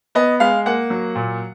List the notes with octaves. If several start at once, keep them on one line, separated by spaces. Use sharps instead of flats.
B3 D#5
G#3 F5
A#3 F#5
F#3
A#2